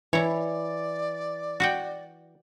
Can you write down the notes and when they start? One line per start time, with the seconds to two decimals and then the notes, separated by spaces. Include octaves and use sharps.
0.13 E3 E4 C#5 D5
1.60 F#4 F#5 G5